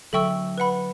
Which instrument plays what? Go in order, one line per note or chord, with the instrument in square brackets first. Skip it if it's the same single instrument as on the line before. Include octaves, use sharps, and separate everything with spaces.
[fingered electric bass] D3 F#3 [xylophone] A4 E5 G5 C#6 E6
[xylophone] B4 F#5 B5